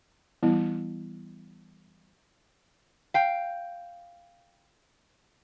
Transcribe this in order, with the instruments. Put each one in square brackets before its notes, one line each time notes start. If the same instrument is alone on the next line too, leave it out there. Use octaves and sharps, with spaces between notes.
[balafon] E3 G3 B3 E4
[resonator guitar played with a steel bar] F5 G5